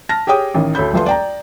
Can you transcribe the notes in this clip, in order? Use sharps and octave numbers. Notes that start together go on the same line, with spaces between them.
A5 F6 A#6
G4 G#4 C#5 G5 D#6
A1 D#3
D2 A4 C#5 B5 G6
D#1 A#1 A3 F4 B4 C6
D5 G5 A#5